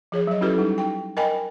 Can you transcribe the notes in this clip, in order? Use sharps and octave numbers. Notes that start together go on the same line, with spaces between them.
F3 G#4 C#5
F#3 D#5
C#4 E4 F#4 G4 A4 B4
G3 D#4
D#4 G5
A#4 D#5 G5 G#5 B5